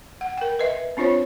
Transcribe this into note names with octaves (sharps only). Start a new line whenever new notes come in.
F#5
A#4 G5
B4 D#5 E5
C4 D4 F4 C5 C#5